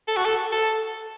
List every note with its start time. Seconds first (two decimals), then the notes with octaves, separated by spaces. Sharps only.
0.08 A4
0.17 F#4
0.25 A4
0.52 A4